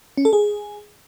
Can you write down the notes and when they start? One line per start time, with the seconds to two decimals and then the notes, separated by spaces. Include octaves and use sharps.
0.17 C#4
0.25 A4
0.33 G#4